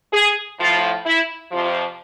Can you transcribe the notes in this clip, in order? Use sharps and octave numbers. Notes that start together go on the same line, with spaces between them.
G#4
A2 F3 F4
E4
F2 C3 F3 F4